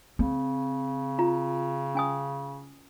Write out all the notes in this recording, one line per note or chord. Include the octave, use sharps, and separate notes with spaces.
C#3 C4
F4 A#5
C#4 G#5 D#6